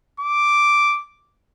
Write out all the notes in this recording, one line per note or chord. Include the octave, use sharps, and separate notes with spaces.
D6